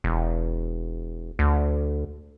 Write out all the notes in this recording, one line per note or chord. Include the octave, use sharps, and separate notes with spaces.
E1
D2